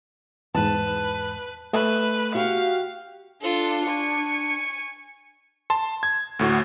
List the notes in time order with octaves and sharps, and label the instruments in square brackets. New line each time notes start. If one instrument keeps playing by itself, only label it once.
[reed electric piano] E2 G#2 [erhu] B4 [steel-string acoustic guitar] A5
[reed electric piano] A3 [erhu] B4 [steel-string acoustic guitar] E5
[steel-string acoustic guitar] F#4 G4 [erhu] F5
[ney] D4 [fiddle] F4 A4
[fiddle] G#5 C#6
[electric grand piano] A5 C6
G#6
D2 A2 F#4